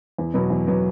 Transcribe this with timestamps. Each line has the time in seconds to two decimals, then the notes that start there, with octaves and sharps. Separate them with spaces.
0.18 E2
0.34 B2 F#3 B3
0.50 E2
0.67 B2 F#3 B3